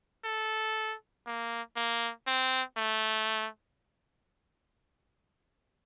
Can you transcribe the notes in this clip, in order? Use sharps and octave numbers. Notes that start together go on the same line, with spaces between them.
A4
A#3
A#3
C4
A3